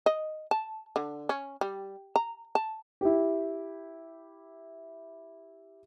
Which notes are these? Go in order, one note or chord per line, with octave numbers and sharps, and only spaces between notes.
D#5
A5
D3
C#4
G3
A#5
A5
E4 G4